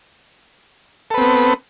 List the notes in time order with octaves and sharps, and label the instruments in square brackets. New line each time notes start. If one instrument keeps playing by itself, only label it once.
[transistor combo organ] A4
B4
C4
B3